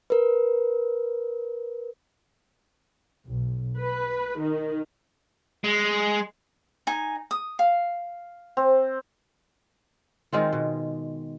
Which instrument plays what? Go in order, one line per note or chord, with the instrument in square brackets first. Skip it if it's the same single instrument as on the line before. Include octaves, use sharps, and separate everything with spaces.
[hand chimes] A#4 B4
[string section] B1
B4
D#3
[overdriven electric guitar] G#3
[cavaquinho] D#4 G#5
D#6
F5
[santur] C4
[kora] D#3 G#3 C4 F4
B2